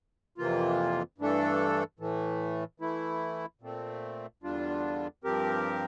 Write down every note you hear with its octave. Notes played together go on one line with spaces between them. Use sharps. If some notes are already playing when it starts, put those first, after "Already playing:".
F2 C3 E3 A#3 F4
G2 E3 A3 D4 A4
A2 E3 A3
E3 A3 E4
A#2 A3 C4
E2 D3 G3 D4 F4
G2 F3 C4 G4 A#4